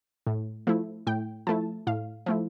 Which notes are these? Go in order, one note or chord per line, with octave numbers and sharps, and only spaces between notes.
A2
F3 A3 E4
A2 G5
F3 A3 E4 A5
A2 F5
F3 A3 E4